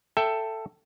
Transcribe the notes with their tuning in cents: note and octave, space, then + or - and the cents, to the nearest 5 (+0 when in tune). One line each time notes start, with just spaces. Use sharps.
A4 +10 E5 +10 G5 +0